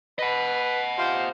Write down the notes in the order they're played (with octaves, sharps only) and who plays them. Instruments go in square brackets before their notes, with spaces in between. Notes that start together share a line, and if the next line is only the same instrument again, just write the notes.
[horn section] B4 [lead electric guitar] D#5 F#5
[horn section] C3 F4 C5